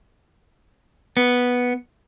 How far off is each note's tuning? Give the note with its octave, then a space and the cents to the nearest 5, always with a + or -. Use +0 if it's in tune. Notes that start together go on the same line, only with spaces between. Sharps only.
B3 -5